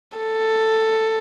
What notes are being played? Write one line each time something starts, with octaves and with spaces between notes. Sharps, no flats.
A4